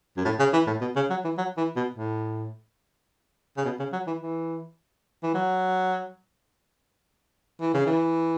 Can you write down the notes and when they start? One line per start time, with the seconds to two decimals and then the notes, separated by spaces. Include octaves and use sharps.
0.17 F#2
0.25 A2
0.39 C#3
0.53 E3
0.67 A2
0.81 B2
0.96 C#3
1.10 F#3
1.24 E3
1.38 F#3
1.57 E3
1.76 B2
1.94 A2
3.57 C#3
3.65 B2
3.79 C#3
3.93 F#3
4.07 E3
4.22 E3
5.23 E3
5.34 F#3
7.61 E3
7.74 C#3
7.86 E3